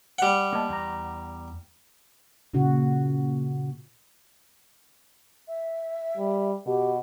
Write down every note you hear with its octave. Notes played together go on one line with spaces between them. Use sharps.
G3 F#5
A#3 D#5 A5
E2 A#5
A#2 C#3 F#4
E5
G3
B2 G4